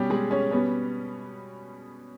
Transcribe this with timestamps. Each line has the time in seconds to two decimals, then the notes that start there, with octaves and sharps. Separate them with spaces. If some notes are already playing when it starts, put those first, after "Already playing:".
Already playing: B2 G3 C#4 G4
0.10 G#3 G#4
0.31 C#4 C#5
0.51 B2 G3 B3 C#4 C#5